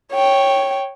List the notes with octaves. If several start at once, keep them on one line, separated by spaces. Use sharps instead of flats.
C#5 G5